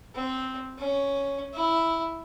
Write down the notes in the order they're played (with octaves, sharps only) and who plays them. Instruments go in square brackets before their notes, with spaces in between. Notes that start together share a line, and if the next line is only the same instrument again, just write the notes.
[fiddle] C4
C#4
E4